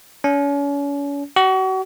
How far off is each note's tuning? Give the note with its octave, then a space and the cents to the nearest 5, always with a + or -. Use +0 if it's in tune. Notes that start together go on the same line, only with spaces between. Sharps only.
C#4 +40
F#4 +35